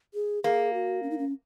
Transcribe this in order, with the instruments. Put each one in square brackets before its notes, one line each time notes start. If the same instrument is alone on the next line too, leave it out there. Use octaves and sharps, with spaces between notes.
[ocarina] G#4
[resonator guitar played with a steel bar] A#3 [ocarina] G#4
[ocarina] F#4
C#4
D#4
C#4